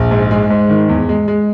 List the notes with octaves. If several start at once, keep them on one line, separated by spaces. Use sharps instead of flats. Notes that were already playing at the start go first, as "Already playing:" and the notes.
Already playing: A#1
G#2
G#3
G#2
D#3
E2
G#3
G#3